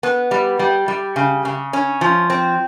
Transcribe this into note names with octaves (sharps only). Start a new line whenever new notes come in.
B3
G3
G3
G3
C#3
C#3
C#4
F3
C4